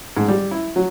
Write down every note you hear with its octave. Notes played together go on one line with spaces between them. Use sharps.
G#2
G3
E4
F#3